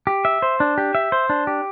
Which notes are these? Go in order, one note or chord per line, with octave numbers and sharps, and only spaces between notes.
G4
E5
C5
D4
G4
E5
C5
D4
G4